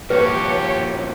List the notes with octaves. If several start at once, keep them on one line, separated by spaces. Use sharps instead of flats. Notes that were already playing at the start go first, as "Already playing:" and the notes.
A#2 F3 F#4 G4 B4 C#5